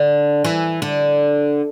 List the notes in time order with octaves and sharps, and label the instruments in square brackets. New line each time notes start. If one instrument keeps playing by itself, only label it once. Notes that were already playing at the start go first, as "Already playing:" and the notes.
Already playing: [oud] D3
E3
D3